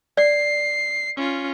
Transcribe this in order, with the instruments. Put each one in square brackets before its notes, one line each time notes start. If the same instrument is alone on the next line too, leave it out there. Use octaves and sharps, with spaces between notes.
[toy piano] D5 [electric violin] C7
[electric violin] C#4 F4